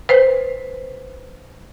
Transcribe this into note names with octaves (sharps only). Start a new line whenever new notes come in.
B4 C5